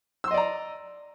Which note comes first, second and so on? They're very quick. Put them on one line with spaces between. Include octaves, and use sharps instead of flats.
E6 C6 D#5 D5 A#5